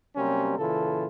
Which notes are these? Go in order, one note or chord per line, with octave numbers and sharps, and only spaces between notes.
C3 F#3 G3 A#3 C4 C#4
A#2 C#3 E3 F4 A4